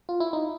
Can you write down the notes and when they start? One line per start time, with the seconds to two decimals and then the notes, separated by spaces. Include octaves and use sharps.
0.09 F4
0.20 E4
0.33 D#4